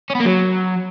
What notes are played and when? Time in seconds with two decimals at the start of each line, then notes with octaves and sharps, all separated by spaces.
0.10 C#4
0.15 B3
0.20 A#3
0.25 F#3